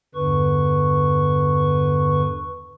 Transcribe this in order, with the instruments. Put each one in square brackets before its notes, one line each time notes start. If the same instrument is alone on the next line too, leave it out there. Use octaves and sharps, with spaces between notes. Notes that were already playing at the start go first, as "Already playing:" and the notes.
[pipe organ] E2 G2 D3 B4 C#6